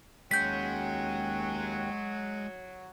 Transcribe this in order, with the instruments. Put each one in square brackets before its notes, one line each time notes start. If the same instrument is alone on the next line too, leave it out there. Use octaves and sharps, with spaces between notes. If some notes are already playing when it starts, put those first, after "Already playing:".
[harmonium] D#2 C#4 G5 [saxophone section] F#3 [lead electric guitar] G#3 [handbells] G6 B6